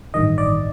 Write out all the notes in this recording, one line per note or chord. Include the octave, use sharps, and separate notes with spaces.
A1 G2 D#3 D#5
D5